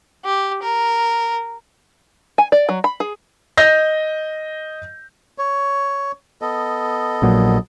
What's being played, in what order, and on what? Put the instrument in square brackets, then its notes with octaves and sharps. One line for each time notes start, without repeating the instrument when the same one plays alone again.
[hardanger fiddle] G4
A#4
[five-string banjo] G#5
D5
F#3
B5
G#4
[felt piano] D#5 G6 A#6
[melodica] C#5
B3 A4 D#5
[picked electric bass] A#1 A#2 F#3